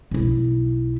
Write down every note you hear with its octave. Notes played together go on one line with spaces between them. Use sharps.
B1 E4